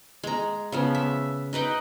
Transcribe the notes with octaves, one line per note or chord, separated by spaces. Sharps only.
G#3 A#5
C#3 F3 B3
E5
D#4 B4 D#5 G5